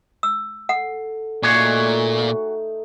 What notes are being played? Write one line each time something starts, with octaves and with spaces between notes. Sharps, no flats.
E6
A4 F#5
A#2 A3 D#4 F#4 G#4 C#5